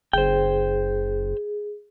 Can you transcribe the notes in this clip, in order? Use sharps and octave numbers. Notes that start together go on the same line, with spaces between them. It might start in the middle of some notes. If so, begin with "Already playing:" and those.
F#1 G#4 C5 G5